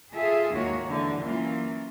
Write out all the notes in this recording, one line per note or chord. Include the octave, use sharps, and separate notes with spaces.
F4 G#4 A4 E5
D#2 D#3 G#3 A#3 F#4 C#5
D3 E3
E3 F#3 A#3 C#4 F4